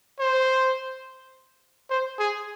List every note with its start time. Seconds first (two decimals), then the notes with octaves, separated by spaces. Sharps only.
0.20 C5
1.90 C5
2.19 G#4